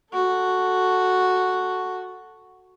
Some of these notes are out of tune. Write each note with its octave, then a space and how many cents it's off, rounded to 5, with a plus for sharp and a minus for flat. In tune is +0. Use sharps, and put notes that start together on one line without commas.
F#4 +0 A4 +0